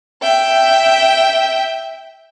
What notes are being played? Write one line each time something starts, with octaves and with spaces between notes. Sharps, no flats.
E5 G5